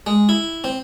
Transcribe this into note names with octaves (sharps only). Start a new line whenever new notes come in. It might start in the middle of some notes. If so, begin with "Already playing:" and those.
G#3
E4
C4